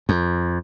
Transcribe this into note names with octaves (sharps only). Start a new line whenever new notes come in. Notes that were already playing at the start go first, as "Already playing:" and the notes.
F2